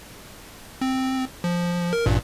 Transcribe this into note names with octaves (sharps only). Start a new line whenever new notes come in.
C4
F3
A#4
A1 G2 A#2